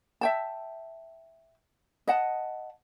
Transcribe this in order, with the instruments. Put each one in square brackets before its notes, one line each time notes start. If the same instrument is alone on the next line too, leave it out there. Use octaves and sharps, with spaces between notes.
[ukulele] E5 G5 A5
D#5 F#5 A5